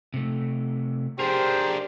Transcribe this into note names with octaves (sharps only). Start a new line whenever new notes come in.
C3 A3
D4 G4 G#4 A#4 C5